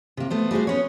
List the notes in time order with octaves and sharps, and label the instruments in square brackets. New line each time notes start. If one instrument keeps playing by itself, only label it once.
[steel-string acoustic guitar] C3 A#3
A3 B3 C5
G3 G#3 F#4 C5
B3 C#4 C#5